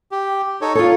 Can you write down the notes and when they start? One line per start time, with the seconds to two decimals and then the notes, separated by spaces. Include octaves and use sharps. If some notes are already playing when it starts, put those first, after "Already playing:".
0.12 G4
0.61 D#4 A4 C#5
0.75 F4 A4 C#5